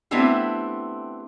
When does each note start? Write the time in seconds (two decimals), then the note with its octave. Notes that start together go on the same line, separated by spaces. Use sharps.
0.11 A3 B3 C4 D4 E4 G4